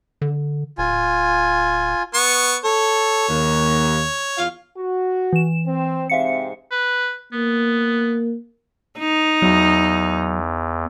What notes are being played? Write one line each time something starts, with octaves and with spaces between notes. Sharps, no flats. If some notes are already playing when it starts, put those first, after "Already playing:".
D3
D1 F4 G#5
B3 C#6
A4 C#5
D#2
E2 F4 F5
F#4
E3 E7
C4
G#2 C3 C4 E5 F5 C#7
B4
A#3 B3
D#4
E2 F#3